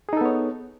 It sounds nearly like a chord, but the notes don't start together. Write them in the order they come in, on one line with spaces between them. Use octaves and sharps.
G#4 D#4 A4 B3 C#5